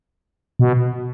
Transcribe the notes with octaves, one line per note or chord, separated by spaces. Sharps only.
B2